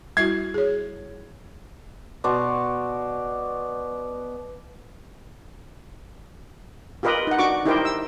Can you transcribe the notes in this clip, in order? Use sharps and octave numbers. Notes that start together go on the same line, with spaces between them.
G3 E4 F#4 G#6 C7
G#4 C#5
B2 D5 C6 C#6
F4 G4 A#4 B4 D#5
D#4 F#5
D4 F#4 C#6 D6
D#4 E4 G4 A#4 C5 G5
E6